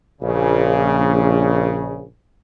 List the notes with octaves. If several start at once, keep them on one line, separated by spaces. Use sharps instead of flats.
A#1 C#3